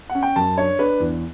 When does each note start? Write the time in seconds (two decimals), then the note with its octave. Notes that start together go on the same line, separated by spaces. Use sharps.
0.10 F#5
0.15 C#4
0.23 G5
0.36 F#2 A5
0.57 D4 C#5
0.79 D4 B4
1.00 E2